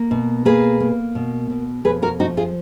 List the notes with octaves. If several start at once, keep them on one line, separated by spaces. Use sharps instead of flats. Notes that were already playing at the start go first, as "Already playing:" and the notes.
Already playing: A#3
B2
A#3 G#4 B4
A#3
B2
B2
F2 G#4 B4
F#4 A#4
F3 D#4 F#4
F4 G#4